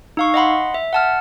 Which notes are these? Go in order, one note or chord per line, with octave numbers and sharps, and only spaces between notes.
D#4 F5 C#6
D#5 F#5 B5 C6
E5
F#5 A5 F6